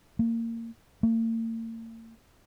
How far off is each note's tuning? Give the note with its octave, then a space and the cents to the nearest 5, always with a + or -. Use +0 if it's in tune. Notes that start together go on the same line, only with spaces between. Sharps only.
A#3 -25
A#3 -45